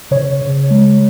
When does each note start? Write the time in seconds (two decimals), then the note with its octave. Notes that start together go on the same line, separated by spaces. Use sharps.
0.11 C#3 C#5
0.42 C#3
0.71 G#3